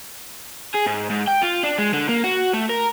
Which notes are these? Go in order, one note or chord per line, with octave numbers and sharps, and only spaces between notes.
G#4
G#2
G#2
G5
F4
D4
G#3
D3
A#3
F#4
A3
A#4